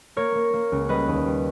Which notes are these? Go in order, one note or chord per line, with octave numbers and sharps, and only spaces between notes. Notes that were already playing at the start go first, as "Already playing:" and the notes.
A#3 A#4 C#5
A#3
A#3
C#2
G3 B4 D#5
D#2
G3